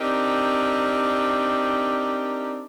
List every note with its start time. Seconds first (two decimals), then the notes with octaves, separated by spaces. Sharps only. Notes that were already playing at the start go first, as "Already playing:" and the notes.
0.01 C4 D4 D#4 G4 A#4